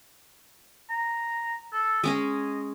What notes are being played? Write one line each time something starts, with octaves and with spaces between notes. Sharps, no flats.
A#5
A4
G#3 C#4 D#5 G#5